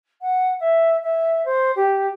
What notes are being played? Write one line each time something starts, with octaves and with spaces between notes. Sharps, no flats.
F#5
E5
E5
C5
G4